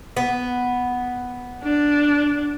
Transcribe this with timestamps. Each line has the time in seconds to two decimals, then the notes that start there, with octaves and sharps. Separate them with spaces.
0.17 B3
1.64 D4